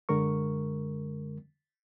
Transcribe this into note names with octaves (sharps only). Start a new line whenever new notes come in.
F#2 D3 G#3 A#4 C#6